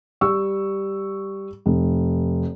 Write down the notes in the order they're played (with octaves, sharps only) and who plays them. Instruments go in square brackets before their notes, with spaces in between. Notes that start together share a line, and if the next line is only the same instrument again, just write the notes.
[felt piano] G3 C#6 E6
F1